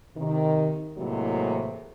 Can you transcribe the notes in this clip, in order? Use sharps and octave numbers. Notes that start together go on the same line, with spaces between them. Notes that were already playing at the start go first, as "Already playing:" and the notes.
C3 D#3
A2 C3 E3 F#3 G#3 A#3